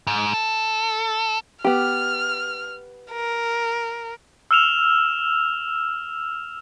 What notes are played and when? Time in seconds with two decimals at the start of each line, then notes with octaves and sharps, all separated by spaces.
0.07 G#2
0.33 A4
1.64 B3 G4 F6
3.12 A#4
4.51 E6 F6 E7 F7